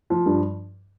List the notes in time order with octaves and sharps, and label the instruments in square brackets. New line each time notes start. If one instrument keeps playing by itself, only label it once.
[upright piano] F3
G2